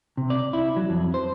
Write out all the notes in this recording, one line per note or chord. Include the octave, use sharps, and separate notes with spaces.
C3
D5
E4
F#3
F2
C5